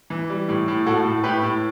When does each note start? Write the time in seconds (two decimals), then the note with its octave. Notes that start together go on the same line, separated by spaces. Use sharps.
0.10 E3
0.30 G3
0.49 A2
0.68 A2
0.86 A2 F#4 A4
1.05 A2
1.23 A2 G4 B4
1.43 A2